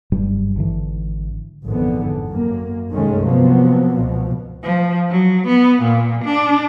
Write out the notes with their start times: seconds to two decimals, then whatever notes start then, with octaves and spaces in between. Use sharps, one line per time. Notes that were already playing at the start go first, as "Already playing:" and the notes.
0.12 F#1 G2 G3
0.55 G#1 D3 E3
1.65 G#1 F2 D3 E3 B3
2.29 F#2 A#3
2.93 C2 G2 D#3 G#3 A3 C#4
3.25 C3 F3 F#3 A#3 B3
3.95 C#2 B2 F3
4.63 F3
5.11 F#3
5.47 B3
5.82 A#2
6.24 D4